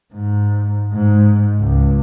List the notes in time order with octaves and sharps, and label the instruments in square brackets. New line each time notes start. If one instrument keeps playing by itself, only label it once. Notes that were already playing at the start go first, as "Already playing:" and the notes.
[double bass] G#2
G#2
C#2